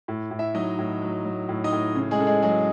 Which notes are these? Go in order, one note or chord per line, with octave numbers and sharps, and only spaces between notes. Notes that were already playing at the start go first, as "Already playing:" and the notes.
A2
A2
E4 E5
F#3 D#4 D#5
A2
F#3
F#3
A2
D#4 D#5
A2
C#3
G#3 G#4
C#3 A4
G#3 G#4
F#3 G#3 G#4